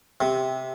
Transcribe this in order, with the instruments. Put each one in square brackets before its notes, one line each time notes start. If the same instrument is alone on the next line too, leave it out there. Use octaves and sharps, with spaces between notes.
[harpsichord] C3